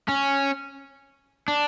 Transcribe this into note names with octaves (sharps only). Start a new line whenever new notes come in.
C#4
D4